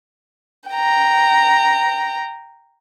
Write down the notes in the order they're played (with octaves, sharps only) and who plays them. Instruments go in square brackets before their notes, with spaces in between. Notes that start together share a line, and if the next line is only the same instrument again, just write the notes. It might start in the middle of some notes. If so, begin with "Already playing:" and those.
[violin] G5 A#5